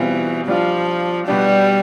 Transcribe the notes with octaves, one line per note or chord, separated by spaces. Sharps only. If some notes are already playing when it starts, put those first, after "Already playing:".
Already playing: B2 E3 G3 C4 F4
F3 G3 D4 F4
B2 G3 B3 D4 G4